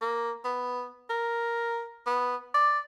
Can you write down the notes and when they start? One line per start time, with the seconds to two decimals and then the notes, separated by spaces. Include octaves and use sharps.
0.01 A#3
0.45 B3
1.10 A#4
2.07 B3
2.54 D5